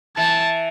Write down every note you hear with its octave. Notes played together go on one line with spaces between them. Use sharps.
E3 A5